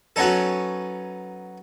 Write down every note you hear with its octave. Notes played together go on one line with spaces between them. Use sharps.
F#3 B3 C#4 D#4 A4